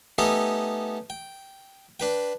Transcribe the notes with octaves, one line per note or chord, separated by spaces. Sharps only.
A3 B3 C#4 D#4 G4 A4
G5
D4 B4 G5